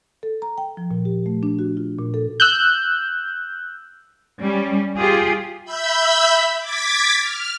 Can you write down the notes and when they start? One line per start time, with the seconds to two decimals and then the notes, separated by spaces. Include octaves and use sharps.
0.23 A4
0.42 A#5
0.58 G5
0.77 F3
0.91 A#2
1.05 G4
1.26 A3
1.43 D4
1.59 F#4
1.77 F4
1.98 A#2
2.14 A4
2.40 E6 F#6 G6
4.40 G3 C#4
4.96 F4 G4 G#4
5.65 E5 B5 E6 G6
6.59 D6 G#6 A6 B6
7.20 F6